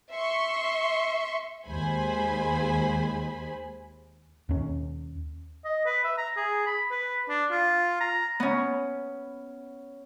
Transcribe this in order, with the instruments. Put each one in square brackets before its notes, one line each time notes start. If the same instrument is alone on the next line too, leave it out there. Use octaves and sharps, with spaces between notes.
[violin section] E5 C6 C#6
[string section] D#2 G#3 C5 G#5 B5
[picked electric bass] D#2 C#4
[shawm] D#5
B4
E5
A#5
G#4
B5
B4
D4
F4
A#5
[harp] B3 C#4